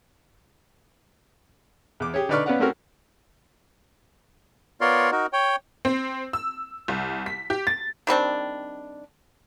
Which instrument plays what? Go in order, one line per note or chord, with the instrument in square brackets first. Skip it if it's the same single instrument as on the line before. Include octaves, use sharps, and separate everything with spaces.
[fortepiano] E2 D6
G4 G#4 C#5
D3 D#4 B4 D5 C#6 F6
B3 C#4 B4 D5 F5 F#5
A3 C4 C#4 F#4 A#4
[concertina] B3 F4 A#4 C#5 D5 C6
D#4 F#4 A#4
C#5 G5
[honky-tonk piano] C4
E6
C2
B6
G4
A6
[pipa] D#3 G3 C4 D4